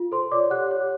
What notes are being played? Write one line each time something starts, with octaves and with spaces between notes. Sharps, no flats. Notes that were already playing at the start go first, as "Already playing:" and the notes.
Already playing: F4
A4 C5 C6
C#5 D5 D6
G4 F#5 F#6
C#5